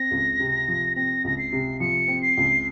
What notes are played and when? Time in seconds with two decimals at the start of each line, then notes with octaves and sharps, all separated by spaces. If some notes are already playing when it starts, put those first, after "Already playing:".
Already playing: C4 A#6
0.11 C#2
0.40 C3
0.68 F3
0.96 C4 A#6
1.24 C#2 A#6
1.38 C7
1.53 C3
1.80 F3 C#7
2.08 C4
2.22 C7
2.37 C#2